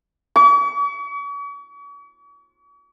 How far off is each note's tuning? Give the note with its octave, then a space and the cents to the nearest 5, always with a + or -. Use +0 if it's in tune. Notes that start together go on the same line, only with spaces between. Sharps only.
C#6 +45